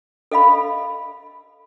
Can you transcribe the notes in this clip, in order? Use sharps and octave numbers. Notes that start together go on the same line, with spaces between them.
A4 D#5 F5 B5